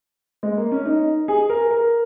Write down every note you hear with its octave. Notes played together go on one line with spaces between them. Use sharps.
G#3
A#3
C#4
D#4
G#4
A#4
A#4